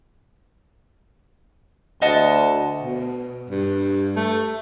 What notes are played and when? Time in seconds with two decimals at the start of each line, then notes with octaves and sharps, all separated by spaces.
2.02 D2 D#5 F#5 A5
2.83 B2
3.50 G2
4.16 A3